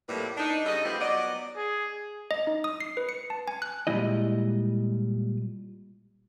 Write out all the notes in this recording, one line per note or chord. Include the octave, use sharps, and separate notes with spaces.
F2 A2 G3 A3 A#3 B4
D4 D#4
C#3 G3 A4 D#5
G3 A3 B3 C4 F4 G4
F#3 B3 D5 D#5
G#4
D#5
D#4
D#6
C7
B4
C#7
A5
G#5
F#6
A#2 G3 G#3 E4 D#5